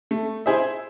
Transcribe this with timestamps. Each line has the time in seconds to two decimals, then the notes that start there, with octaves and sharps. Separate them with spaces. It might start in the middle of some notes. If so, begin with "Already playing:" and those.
0.11 A3
0.46 E4 G#4 C5 E5